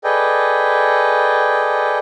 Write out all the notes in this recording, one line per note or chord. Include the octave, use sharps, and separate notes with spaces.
G#4 A4 B4 D5 D#5 G5